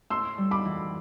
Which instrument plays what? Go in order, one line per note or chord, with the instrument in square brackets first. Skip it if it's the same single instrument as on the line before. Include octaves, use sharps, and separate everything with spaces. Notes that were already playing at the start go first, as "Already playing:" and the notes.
[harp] A2 [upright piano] C6 E6
[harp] G3
[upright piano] B5 D6
[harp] E3